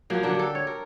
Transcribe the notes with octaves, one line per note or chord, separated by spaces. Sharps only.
F3 F#3 A#3
D3 F#3 D4
G4 A4
C#5
A#4